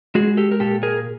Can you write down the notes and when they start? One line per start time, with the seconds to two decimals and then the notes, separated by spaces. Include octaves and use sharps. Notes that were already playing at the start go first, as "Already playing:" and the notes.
0.15 G#3 F#4 G#4
0.37 G4 A4
0.51 A#4
0.60 A#2 G4 A4
0.83 G#4 A#4